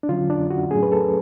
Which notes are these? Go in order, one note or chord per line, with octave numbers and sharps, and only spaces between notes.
D4
D3 F#3 C#4 F4
D4
F#4
A2 F#3 A3 C#4 G#4
B4
A4